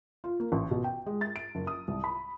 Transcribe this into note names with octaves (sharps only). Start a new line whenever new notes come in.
F4
A#3
A1
B2
G5
G#3
A6
D7
F#1
D#6
C2
B5